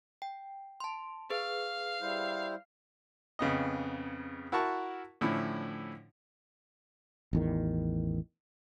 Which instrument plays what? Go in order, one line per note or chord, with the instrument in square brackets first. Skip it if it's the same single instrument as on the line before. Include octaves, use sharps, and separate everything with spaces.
[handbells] G5
A5 C6
[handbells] G#4 B4 [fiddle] F5
[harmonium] G3 E4 C5
[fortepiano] F2 C#3 B3 D#5
E4 F#4 A#4 F#5 A5 C#6
A2 D3 F3 C#4 E4
[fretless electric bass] A1 E2 D#3